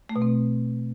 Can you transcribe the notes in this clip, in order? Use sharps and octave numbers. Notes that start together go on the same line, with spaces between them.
A3
B2
C4